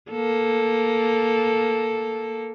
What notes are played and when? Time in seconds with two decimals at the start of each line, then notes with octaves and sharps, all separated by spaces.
0.11 A#3 A4